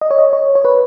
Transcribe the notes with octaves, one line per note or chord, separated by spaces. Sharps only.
D#5
C#5
D#5
C#5
C#5
B4